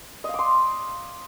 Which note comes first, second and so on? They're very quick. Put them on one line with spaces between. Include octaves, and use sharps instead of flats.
D#5 F5 D6 C6